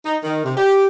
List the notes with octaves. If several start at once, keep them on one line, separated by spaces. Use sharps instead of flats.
D#4
D#3
C3
G4